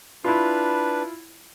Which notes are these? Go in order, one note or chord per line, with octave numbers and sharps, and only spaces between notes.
D4 E4 F4 B4